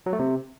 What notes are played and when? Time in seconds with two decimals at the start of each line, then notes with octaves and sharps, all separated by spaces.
0.06 F#3
0.13 A3
0.19 C3